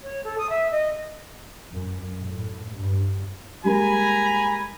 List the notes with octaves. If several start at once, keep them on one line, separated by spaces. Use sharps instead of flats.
C#5
A4
D#6
E5
D#5
F#2
A2
G2
G3 G#3 A#3 G#5 A#5 B5